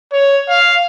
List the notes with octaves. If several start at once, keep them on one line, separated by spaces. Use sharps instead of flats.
C#5
F5